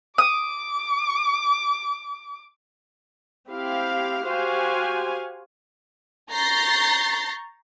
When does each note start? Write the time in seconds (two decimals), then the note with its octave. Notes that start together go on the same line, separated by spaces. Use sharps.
0.18 D6 D#6
3.51 C4 E4 G4 F5
4.28 F#4 G4 C5 F5 G#5
6.32 A#5 C#6 G6 A6 A#6 C7